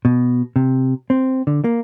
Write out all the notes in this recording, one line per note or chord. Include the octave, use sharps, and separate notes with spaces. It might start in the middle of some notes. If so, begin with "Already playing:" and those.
B2
C3
C4
D3
A#3